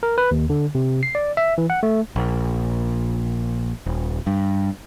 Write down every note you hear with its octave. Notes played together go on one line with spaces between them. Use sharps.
A#4
B4
D#2
D3
C3
C7
D5
E5
E3
F#5
A3
A#1
D#1
G2